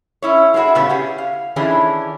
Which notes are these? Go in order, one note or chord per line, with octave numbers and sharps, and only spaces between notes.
C#4 E4 C#5
G#3 A#3 E4 F#4 G#4
A#2 C#3 G3 B3 C#4 F4
C#4 G4 G#4
F5
D#3 E3 C#4 D4 E4 G#4